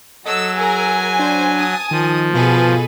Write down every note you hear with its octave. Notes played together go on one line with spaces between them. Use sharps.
F#3 A4 D#5 E6
G#4 A#4 G#5 E6
D4 C5
A5 D#6
D#3 F3
B2 F4 G#4 A4 B4